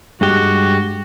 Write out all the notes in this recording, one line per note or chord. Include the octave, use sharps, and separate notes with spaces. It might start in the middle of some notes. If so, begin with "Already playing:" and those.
G2 G#3 F#4 G4